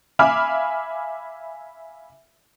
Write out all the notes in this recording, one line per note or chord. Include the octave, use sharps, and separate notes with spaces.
E5 F5 G#5 B5 D6 F6